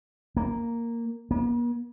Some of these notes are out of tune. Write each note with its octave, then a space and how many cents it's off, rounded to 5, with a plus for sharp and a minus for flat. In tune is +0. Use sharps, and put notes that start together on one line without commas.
A#3 -5
A#3 +45